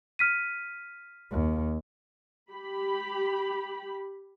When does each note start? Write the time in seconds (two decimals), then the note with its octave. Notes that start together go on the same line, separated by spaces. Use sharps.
0.19 F6 B6 D#7
1.31 D#2
2.51 G4 B5